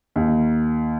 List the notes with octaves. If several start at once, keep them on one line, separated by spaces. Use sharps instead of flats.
D#2